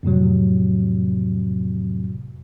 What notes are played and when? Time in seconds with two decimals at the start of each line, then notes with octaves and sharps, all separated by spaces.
0.03 F2 A2 C3 F#3